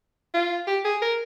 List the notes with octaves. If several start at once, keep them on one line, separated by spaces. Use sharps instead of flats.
F4
G4
G#4
A#4